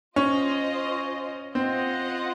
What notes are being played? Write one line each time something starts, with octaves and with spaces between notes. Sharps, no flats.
C#4 F4 C5 D#5
C4 F4 C5 D#5 F#5